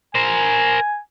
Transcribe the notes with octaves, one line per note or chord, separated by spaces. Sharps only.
A#4 C5 G#5